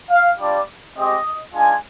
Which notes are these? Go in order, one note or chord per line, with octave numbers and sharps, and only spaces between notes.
F5
G3 D4 F4 D5
G#3 C4 G4 D#5
G#3 D4 F4 G#5